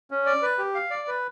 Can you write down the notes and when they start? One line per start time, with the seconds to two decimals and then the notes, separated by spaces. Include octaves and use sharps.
0.11 C#4
0.26 D5
0.42 B4
0.58 G4
0.75 F5
0.90 D5
1.08 B4